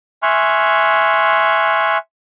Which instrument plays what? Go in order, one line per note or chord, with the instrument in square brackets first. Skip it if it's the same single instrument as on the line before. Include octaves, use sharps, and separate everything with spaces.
[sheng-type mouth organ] E5 G#5 C6 C#6 F6 F#6